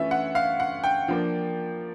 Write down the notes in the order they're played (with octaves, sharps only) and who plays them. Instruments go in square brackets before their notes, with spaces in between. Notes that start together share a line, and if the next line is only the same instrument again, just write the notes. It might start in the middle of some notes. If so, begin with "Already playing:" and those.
Already playing: [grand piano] E3 A3 C#4 F4 E5
F#5
F5
F#5
G5
F3 A#3 D4